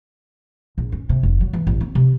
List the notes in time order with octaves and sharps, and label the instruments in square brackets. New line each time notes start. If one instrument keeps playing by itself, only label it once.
[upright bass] A#1
C#4
C3
F1
F#3
E3
A1
C4
C3